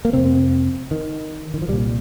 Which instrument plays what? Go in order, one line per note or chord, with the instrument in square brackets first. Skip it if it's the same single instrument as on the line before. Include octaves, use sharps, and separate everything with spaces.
[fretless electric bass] A#3
F2 C3 C4
D#3
D#3
F3
C2 A#2 G3